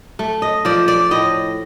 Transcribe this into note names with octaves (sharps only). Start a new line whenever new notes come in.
A3
D#5
F3 D5
D5
A2 D#5